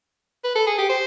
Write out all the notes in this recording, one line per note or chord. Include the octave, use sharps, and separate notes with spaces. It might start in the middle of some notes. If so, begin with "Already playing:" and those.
B4
A4
G#4
G4
C5